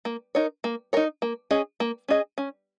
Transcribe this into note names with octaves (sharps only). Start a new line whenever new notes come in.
A#3
D#4 A#4 C#5
A#3
D#4 A#4 C#5
A#3
C#4 G#4 D#5
A#3
C#4 G#4 D#5
C#4